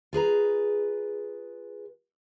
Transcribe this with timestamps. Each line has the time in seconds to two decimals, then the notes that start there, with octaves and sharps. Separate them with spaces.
0.13 F4 G#4 B4 A#5